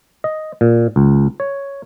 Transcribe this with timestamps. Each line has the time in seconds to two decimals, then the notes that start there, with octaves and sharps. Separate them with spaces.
0.24 D#5
0.61 A#2
0.96 C#2
1.40 C#5